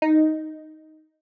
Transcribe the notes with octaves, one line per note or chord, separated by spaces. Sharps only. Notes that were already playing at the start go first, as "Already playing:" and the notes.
D#4